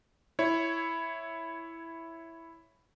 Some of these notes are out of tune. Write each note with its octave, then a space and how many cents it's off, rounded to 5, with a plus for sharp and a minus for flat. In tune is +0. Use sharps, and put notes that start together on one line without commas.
E4 +0 C#5 +0